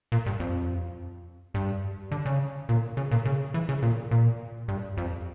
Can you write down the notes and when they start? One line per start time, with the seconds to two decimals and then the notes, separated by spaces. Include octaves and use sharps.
0.12 A#2
0.26 G2
0.40 F2
1.54 G2
2.11 D3
2.26 C#3
2.69 A#2
2.97 C#3
3.11 A#2
3.25 C#3
3.54 E3
3.69 C#3
3.83 A#2
4.11 A#2
4.68 G2
4.97 F2